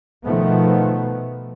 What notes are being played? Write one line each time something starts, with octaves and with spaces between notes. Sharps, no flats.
B2 D#3 F3 A3 B3